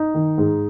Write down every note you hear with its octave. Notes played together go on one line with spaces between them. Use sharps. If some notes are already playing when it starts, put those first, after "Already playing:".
Already playing: D#4
D#3
G#2